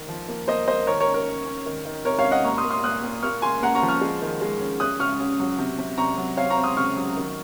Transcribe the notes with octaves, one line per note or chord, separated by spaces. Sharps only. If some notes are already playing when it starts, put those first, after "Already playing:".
Already playing: D#3
F3
A#3
A#3 C5 D#5
A#3 C5 D#5
D#3 A#4 C#5
A#4 C#5
C#4
A#4
C#4
C#4
D#3
D#3
C3 A#4 C#5
C#5 F5
C#4
D#5 F#5
A#2 A#5 C#6
C6 D#6
A#2
C6 D#6
A#2 D#6 F#6
A#2
A#3 C#6 F6
C#3 G#5 C6
A#3 F#5 A#5
A#5 C#6
F3
C#6 F6
G#3
D#3
G#3
C#4
C#4 D#6 F#6
C#3 C#6 F6
C#4
F#3
C3
C3
C3 A#5 C#6
F#3
C4 C#5 F5
A#5 C#6
C4
C6 D#6
C#3 C#6 F6
F#3
D#3